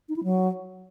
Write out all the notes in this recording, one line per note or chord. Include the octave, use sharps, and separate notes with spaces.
D#4
E4
F#3